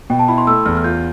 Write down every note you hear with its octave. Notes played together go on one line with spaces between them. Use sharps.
B2 G5
A5
E4 B5
C6
A3 E6
E2 F6
F6
F4 G6